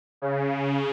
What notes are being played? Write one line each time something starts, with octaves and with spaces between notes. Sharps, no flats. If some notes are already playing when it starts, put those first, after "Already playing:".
C#3